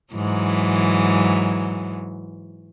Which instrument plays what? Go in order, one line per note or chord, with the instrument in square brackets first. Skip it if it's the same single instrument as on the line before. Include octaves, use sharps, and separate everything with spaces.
[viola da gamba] G#2 E3 F#3